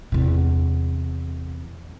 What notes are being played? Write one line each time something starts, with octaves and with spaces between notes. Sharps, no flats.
E2 C3